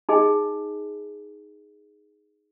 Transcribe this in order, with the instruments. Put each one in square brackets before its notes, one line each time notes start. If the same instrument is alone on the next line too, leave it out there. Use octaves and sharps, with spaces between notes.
[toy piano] D#4 G#4 D#5 G#5